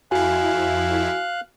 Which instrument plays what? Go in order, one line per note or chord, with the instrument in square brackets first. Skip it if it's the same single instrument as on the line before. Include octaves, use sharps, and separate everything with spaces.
[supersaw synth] F2 E4 [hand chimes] F#4 G#5 [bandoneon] F5 F#6